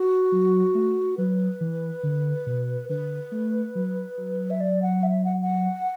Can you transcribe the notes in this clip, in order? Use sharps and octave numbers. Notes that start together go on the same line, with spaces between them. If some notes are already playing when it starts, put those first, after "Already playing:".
Already playing: F#4
F#3
A3
F#3 B4
E3
D3
B2
D3 B4
A3
F#3
F#3
E5
D5
F#5
E5
F#5
F#5